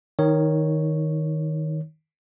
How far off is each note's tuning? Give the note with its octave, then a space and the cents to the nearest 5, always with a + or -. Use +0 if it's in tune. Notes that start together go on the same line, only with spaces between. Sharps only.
D#3 +5 D#4 +45 C#5 +0